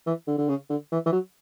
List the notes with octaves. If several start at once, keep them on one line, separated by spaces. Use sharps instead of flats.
E3
D3
D3
C#3
D3
E3
E3
F#3